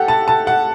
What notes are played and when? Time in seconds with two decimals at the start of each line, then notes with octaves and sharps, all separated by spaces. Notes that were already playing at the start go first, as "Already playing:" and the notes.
Already playing: G4 A4 F#5
0.08 A5
0.28 A5
0.47 F#5